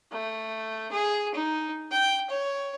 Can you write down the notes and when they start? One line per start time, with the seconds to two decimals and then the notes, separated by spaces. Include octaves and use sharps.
0.11 A3
0.91 G#4
1.34 D#4
1.91 G5
2.30 C#5